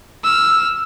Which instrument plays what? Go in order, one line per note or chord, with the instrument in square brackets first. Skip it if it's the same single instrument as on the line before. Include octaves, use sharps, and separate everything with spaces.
[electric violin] E6 F6